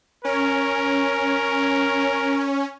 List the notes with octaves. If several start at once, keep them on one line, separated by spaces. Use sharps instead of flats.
C#4 A#4